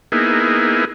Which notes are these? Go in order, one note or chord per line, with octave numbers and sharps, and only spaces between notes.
A#3 B3 D#4 E4 G#4